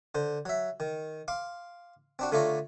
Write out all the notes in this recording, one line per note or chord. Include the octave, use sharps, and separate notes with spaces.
D3 C5
F#3 E5
D#3
F5 C6 D6
C4 D4 F#4
D3 A3 F4 C#5 D5 A#5